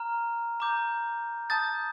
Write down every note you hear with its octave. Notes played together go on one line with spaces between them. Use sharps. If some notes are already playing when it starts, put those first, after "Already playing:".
Already playing: A#5 F6
A#5 D6 G6
A5 D#6 G6 A6